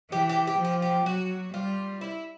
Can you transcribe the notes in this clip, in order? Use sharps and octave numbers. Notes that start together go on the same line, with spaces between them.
E3 G4
G4
G4
F3
G4
G4
F#3 F#4
G3 F4
E4